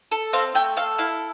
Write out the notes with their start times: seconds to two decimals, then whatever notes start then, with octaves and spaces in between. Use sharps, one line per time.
0.11 A4
0.33 C4 F5
0.55 A3 G5
0.77 A4 F5
0.98 E4 F5